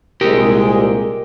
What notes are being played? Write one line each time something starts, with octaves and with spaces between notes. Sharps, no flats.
C2 A#2 G#3 G4 A#4